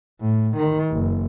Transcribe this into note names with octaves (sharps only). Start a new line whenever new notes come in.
A2
D#3
F#1